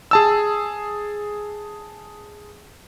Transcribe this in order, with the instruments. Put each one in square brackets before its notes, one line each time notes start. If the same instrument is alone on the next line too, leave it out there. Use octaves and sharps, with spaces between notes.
[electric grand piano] G#4 A5 E6